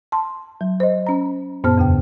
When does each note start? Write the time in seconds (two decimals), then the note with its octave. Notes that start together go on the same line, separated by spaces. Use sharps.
0.12 A5 C6
0.61 F#3
0.80 C5 D#5
1.07 C#4 A#5
1.64 F#2 A#2 B3 C5 A5 F6
1.78 E2 C#3 G5